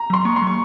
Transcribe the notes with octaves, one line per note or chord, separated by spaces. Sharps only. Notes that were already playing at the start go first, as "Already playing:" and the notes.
Already playing: A#5
F#3 C6
A#3 C#6
C6
F#3
C#6